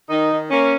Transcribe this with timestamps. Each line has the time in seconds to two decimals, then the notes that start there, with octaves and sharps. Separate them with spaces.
0.09 D#3 D#4
0.30 D#3
0.50 A#3 C#4